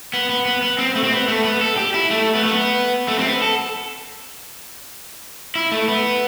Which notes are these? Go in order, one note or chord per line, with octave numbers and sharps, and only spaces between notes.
B3
B3
B3
B3
C4
A3
C4
B3
A3
B3
A4
G4
E4
A3
B3
A3
B3
A3
C4
B3
A4
E4
A3
B3